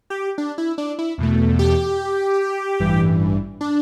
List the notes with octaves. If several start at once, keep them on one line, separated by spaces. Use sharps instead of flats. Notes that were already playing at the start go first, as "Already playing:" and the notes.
G4
D4
E4
D4
E4
E2 B2 A3
G4
A1 G2 E3
D4